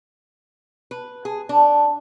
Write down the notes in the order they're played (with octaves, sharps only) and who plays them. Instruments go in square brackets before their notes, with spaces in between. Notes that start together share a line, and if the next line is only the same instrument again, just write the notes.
[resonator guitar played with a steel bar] B4
G#4
D4